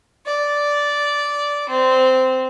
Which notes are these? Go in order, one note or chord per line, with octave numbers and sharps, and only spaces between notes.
D5
C4